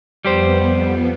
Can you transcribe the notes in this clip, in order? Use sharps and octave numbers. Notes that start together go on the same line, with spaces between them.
F2 G3 B3 G4 C5